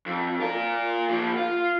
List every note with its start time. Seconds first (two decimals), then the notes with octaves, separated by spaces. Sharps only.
0.06 F2
0.40 F4 A#4
1.10 F3 A#3
1.37 F4